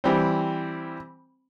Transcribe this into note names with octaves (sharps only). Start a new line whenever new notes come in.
E3 G3 C4